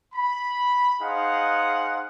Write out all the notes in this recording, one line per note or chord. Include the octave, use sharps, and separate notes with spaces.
B5
D#4 G#4 C5 F5 F#5